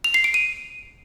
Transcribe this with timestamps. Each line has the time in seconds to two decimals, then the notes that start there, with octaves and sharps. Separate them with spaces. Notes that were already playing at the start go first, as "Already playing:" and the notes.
0.04 F7
0.14 C7
0.24 D7
0.34 D#7